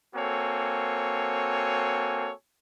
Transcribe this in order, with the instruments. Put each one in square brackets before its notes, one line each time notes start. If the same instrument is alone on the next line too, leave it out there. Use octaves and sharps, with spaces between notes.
[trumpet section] A#3 C4 F#4 A4 C#5 G#5